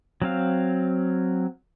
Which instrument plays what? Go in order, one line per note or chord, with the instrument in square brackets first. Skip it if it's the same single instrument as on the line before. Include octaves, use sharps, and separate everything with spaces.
[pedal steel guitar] F#3 C4 F5